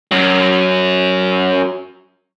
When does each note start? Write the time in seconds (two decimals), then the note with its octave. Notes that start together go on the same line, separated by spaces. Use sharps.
0.11 F#2 F#3